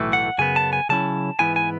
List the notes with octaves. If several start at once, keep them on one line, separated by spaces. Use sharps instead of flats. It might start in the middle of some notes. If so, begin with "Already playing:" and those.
Already playing: B1 A2 E3 A3
F#5
F#2 C#3 B3 G#5
A5
G#5
C#3 F#3 C#4 E4 A5
G#2 E3 B3 E4 G#5
G#5